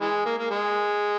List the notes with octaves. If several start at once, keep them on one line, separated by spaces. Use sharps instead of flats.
E3 G#3
A#3
A#3
G#3